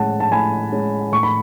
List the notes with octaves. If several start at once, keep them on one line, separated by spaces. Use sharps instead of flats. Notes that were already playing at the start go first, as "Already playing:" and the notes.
Already playing: A2 G#3 C#4 F#5 A5
A5
A2 G#5 B5
G#3 C#4
A2 C#6
B5